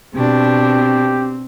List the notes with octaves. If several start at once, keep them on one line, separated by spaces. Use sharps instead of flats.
B2 C4 D4 G4